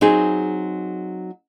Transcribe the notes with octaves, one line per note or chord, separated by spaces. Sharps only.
F#3 C4 D#4 G#4